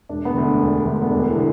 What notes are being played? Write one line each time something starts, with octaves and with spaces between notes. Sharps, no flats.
E1 D4
B3
D2 D3
D4
E1
D2 D3
B3
E1 D4
E4
D3